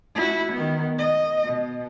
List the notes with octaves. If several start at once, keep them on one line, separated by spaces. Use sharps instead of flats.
E4 F#4
D#3 B3
D#5
B2